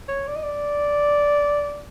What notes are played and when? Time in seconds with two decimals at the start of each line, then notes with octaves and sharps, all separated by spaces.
0.08 C#5
0.27 D5
0.36 D#5
0.43 D5